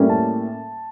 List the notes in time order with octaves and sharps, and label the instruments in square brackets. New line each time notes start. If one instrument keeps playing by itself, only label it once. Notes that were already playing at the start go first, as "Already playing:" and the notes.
Already playing: [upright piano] A2 G3 A#3 C#4
A5